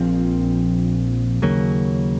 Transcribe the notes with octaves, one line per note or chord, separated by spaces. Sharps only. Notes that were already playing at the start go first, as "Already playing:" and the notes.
Already playing: A#1 A#2 F3 C4
D#2 C#3 F#3 A#3